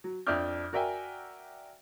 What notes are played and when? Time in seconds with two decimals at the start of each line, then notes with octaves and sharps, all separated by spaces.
0.04 F#3
0.27 F2 D4 E5 D6 F6 G6
0.73 F#4 A#4 D5 E5 G5 G#5